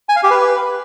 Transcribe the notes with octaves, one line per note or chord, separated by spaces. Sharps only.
G#5
F5
G4
B4